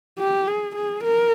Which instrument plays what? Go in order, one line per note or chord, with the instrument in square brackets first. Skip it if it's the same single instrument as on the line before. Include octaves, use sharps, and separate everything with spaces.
[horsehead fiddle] G4
G#4
G#4
A#4